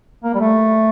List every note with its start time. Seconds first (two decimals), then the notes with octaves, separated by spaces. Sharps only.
0.24 A#3
0.35 G3
0.40 A3